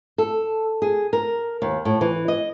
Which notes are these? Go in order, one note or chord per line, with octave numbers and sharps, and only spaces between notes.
A4
G#4
A#4
D#2
A2
E3
D#5